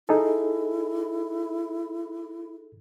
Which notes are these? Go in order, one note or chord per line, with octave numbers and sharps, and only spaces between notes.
D#4 E4 G#4 A4